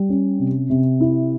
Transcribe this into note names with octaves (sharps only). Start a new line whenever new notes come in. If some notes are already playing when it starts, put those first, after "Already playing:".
Already playing: G3
C#4
C3
C3
E4